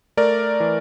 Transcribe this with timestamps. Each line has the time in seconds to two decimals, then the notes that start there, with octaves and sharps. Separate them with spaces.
0.17 A3 A#4 D5
0.60 E3